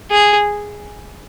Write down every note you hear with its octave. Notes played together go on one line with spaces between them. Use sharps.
G#4